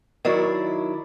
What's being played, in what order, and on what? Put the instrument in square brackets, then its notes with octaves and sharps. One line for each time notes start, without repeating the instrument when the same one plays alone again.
[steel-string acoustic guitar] D#3 F#3 E4 D5